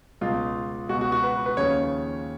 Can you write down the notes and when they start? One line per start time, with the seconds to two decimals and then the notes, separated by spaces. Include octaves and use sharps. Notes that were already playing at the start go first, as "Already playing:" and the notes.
0.21 C#2 B2 F4
0.89 C#2 F#4
0.93 B2
1.01 F#4
1.12 F#4
1.24 B4
1.46 B4
1.57 D#2 C#3 F3 C#5